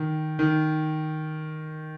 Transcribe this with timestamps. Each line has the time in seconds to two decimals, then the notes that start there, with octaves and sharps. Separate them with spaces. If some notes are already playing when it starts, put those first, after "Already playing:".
Already playing: D#3
0.39 D#3